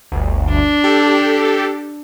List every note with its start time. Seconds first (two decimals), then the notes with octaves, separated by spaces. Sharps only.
0.12 G1 D2
0.50 D4
0.84 G4 A4